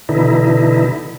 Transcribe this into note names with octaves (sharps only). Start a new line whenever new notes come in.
B2 D3 E3 D#4 E4